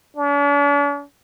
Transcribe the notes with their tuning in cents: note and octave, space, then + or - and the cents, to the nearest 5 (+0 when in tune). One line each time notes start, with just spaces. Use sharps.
D4 -45